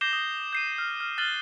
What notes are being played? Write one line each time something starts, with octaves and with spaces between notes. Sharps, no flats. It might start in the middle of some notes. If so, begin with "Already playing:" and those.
D6 G6 A#6 C7 E7 G7
D#6
G6 C7 D#7
F6
F6
F6 F#6 A6 D#7 F#7 G7